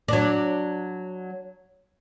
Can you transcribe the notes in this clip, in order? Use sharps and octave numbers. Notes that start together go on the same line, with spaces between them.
F#3 D4